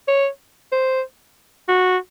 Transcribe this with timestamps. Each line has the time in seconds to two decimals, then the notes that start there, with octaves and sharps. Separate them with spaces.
0.08 C#5
0.72 C5
1.68 F#4